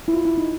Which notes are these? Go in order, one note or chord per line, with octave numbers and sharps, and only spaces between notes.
E4
F4
E4
D#4